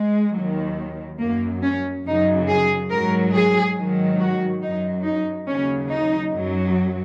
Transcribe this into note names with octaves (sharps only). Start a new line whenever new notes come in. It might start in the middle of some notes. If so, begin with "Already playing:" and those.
Already playing: G#3
D#2 D#3 F#3
F#2 F#3 A#3
C#4
F#2 C#3 F#3 D#4
G#4
G#2 F#3 A#4
G#4
G#2 D#3 F#3
F#4
F#2 F#3 D#4
D#4
D#2 C#3 F#3 C#4
D#4
F#2 F#3